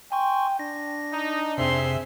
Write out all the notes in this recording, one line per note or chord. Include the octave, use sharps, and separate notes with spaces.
G5 G#5 C6 C#6
D4 A#6
D#4
F2 C3 C4 G#4 E5 C6